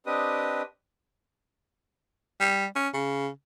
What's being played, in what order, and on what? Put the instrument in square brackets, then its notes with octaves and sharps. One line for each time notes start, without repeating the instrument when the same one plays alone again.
[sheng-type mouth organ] C4 D4 G4 B4 D#5 D#6
[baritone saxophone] G3
C#4
C#3